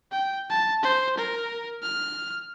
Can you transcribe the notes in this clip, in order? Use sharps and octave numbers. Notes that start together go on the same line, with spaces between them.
G5
A5
C5
A#4
F6